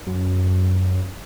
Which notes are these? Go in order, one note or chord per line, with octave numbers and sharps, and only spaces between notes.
F#2